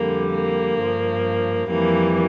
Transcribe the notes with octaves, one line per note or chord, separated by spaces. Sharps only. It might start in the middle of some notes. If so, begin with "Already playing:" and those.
Already playing: F2 D3 G3 A#3
A#3
G2 F3
F2 E3 G3 A#3